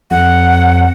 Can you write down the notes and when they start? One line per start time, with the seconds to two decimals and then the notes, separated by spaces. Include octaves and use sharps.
0.11 F2 F#5